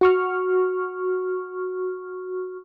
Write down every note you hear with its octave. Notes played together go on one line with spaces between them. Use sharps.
F#4 C#6 F6